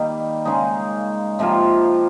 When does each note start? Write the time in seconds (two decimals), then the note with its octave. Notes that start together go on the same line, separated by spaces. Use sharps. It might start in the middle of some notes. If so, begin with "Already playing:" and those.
Already playing: D#3 G3 A#3 D#4
0.45 C#3 G#3 D#4
1.39 C3 F3 A#3 F4